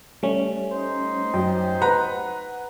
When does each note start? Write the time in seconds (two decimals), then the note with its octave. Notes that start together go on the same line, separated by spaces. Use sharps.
0.23 G3 A3 C#4
0.73 D#4 C5
1.34 F#2 G5
1.82 B4 F#5 A#5